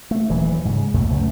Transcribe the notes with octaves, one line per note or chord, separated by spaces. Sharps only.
A3
D#1 E3 F#3
G#2 C#3
B1 F2 A#2 A3
C#2 F#2 A3